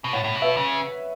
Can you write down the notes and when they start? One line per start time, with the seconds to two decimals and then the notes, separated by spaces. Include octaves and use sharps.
0.04 B2
0.13 A2 C#5 F#5
0.24 A2
0.35 B2
0.42 B4 E5
0.57 C#3